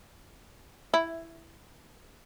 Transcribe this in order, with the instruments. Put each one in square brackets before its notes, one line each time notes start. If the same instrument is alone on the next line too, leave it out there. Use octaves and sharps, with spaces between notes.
[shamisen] E4